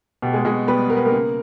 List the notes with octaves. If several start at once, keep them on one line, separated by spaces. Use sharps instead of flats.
B2 G4
G#3 G#4
B2 G#3 G#4
G3 B3 B4
B3 A#4
B4
A#3 A#4
C#3